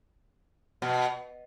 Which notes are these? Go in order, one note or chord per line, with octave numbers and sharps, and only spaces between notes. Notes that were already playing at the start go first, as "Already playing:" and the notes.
B2